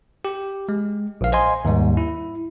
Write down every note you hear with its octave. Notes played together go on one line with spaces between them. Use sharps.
G4
G#3
A#1 F5
C5 D#5 G#5 C6
D#2 G#2 G3
E4